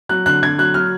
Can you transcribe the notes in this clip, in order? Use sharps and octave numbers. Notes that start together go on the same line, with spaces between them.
F#3 F#6
D3 F#6
D3 G#6
F#3 F#6
F#3 F6